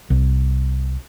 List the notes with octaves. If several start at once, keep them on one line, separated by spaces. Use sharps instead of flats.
C2